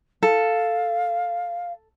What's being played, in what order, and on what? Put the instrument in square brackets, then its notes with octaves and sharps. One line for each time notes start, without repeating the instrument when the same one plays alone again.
[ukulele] A4 [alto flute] F5